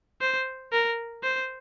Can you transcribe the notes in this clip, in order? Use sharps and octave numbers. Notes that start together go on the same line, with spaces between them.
C5
A#4
C5